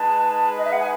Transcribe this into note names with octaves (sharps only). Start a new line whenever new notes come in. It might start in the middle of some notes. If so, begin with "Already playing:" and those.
Already playing: G#3 D#4 G#4 B4 A5
D#5
E5
F#5
G#5